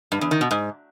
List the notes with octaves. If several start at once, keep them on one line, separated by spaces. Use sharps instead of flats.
G2
E2
D#3
B2
G#2